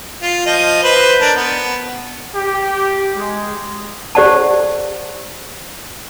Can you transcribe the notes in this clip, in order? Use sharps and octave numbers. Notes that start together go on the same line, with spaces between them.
F4
F3 D#5
B4 C5
D4 A#4
B3
G4
G#3
G4 C5 D5 F#5 A5